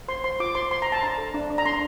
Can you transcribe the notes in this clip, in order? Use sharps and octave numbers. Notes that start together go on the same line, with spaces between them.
C5 C6
C5 C6
F4 D6
C5 C6
C5 C6
A#5
C5
A5
D4 A#5
A4
D4
D4
A#5
D4 C6